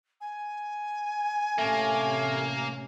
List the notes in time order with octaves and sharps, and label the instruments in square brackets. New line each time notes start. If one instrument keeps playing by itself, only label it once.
[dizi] G#5
[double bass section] A1 C3 C#4 [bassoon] A3 [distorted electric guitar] A#3